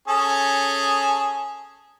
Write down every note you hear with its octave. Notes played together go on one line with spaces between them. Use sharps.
C#4 G#4 A4